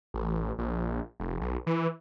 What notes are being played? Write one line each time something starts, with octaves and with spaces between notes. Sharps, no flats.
A1
A#1
F1
B1
E3